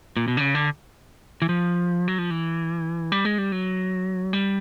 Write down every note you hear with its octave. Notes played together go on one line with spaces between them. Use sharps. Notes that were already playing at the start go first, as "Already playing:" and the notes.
A#2
B2
D3
C#3
D3
E3
F3
F#3
F3
E3
G3
G#3
G3
F#3
G3